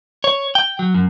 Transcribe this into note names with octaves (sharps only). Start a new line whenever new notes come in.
C#5
G5
F#3
F#2